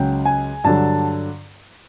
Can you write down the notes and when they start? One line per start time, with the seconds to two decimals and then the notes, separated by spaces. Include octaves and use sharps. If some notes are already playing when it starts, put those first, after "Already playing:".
Already playing: C#2 C#3 F#3 G5
0.25 G#5
0.64 G2 D3 F#3 A5